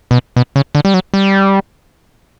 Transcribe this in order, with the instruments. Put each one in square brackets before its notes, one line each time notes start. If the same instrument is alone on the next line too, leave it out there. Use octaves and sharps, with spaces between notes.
[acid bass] B2
B2
C#3
D3
G3
F#3
G3